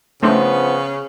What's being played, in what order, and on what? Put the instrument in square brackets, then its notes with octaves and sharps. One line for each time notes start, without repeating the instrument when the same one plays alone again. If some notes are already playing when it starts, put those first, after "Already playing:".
[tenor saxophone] C#3 [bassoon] F3 [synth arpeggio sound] A3 C4 D4 [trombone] B3